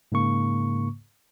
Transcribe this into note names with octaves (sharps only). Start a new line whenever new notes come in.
G#2 C#3 A#3 C#6